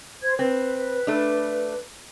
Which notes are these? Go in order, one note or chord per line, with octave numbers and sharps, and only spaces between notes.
C5 G#6
C4 B4
A3 D4